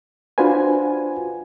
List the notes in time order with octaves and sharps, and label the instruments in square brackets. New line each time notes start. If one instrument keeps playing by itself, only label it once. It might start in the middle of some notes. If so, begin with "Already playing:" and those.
[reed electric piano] D4 F4 F#4 B4 C5 G#5